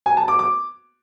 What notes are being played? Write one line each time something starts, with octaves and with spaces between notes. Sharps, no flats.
G#5
A5
D6
D6